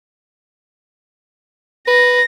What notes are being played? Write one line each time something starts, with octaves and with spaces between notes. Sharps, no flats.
B4 A#6